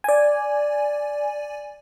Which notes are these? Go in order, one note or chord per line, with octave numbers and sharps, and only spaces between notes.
D5 G#5